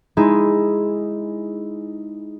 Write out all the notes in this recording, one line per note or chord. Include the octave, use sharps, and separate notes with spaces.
G#3 D#4 E4